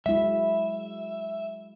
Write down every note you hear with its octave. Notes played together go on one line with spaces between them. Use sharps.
F#3 G#3 E4 E5